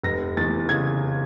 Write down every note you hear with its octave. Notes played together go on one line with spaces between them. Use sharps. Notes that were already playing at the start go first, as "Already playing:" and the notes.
F1 A#6
E2 A6
C#3 G#6